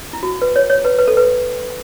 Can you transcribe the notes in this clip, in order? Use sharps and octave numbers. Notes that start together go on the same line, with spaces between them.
E4
F#4
B4
C#5
C#5
B4
B4
A4
B4